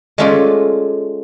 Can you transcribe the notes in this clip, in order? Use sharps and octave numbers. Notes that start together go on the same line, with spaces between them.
G#3 A3 C#4 F4 A4 D5